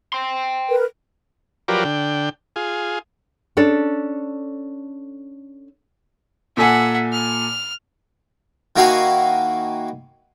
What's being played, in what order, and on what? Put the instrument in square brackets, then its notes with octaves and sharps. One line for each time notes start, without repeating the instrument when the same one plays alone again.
[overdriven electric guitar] G5 C6
[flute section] A#4 B4
[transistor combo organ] F3 F#3 G4 A#4 B4 D5
D3 G5
F4 G#4
[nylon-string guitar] C#4 D4 A4
[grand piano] A#2 A4 G#5 [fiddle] E5 F#5
[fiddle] F6
[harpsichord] D#3 A#3 E4 F#4 F5 G#5